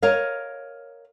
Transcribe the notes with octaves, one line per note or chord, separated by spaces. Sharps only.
A#4 C#5 D#5 F5